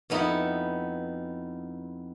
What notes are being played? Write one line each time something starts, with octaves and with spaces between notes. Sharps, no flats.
F2 B3 D#4 E4